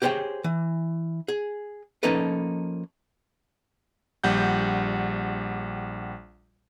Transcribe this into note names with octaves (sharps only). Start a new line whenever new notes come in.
G4 G#4 C5 C#5 G5
E3
G#4
F3 A#3 C#4 D#4 A4 B4
A#1 G3 F#5 G6